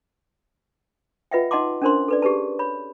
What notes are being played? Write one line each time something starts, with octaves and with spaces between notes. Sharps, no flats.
F4 B4 D#5 E5 F#5 G5
D#4 D#5 F#5 A5 C6 D6
C#4 D4 A#4 C5 C6
A4 B4 D5
G4 G#4 B4 A5
C#5 B5